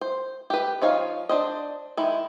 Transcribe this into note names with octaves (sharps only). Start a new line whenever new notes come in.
C5
G4 B4
F3 D#4 C#5 F5
D4 C5 D#5
D#3 G#3 E4